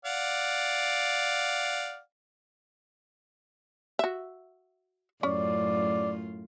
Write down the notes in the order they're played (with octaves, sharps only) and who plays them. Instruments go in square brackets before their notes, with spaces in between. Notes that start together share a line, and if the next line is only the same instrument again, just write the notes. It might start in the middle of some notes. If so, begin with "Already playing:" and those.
[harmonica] D5 F5 F#5
[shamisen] F#4 E5
[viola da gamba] F#2 A2 F4 [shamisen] C#4 [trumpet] D5